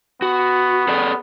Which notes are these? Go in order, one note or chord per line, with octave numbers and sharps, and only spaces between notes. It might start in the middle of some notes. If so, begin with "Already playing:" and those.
B3 F#4
G#4 A4 D5